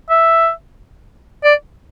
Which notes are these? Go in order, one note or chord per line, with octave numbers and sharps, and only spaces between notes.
E5
D5